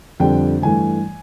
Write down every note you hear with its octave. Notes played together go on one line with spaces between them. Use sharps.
F2 D3 G3 G5
G2 E3 A3 G#5